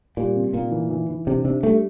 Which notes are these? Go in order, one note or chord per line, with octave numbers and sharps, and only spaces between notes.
A#2 G3
C3
A#2 A#3
E3
E3
E3
C3 D4
C3 D4
G3 A3